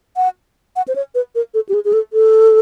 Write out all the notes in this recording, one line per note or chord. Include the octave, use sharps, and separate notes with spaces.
F#5
F#5
C5
C#5
B4
A#4
A4
G4
G#4
G#4
A4
A4